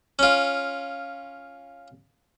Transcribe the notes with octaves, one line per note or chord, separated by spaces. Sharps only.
C#4 F4